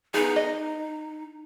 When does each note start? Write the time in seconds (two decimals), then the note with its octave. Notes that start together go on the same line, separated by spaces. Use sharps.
0.14 B3 D#4 G#4
0.36 D#5